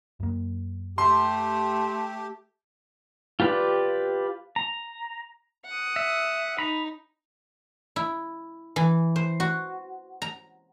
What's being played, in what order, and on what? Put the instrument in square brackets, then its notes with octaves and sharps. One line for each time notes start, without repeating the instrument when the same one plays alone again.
[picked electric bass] F#2 A#3
[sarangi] A3 [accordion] G4 [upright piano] C6
[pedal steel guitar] F4 G4 B4 D5
A#5
[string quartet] F#5 D#6
[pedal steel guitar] E5
[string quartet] D#4 [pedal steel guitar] A#5 B5
[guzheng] E4
E3
C5
F#4
A#5